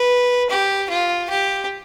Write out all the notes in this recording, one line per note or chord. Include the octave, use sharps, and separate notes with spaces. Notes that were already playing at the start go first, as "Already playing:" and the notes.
Already playing: B4
G4
F4
G4